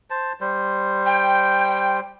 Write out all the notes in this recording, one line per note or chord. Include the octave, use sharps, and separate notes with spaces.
C5 A5
G3 C5
G5